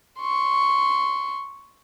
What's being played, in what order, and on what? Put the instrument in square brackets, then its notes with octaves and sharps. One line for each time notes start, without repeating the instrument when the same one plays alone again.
[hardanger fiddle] C6 C#6